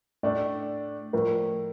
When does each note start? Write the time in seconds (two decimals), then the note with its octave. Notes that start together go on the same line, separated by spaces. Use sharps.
0.23 A2 A3 D4 D5
1.13 A2 F3 A3 A#4